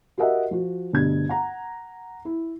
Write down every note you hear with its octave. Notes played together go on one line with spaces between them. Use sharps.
F#4 G4 A#4 D#5 E5 F#5
F3 F#4
D2 G2 B2 G#6
F#5 A#5
E4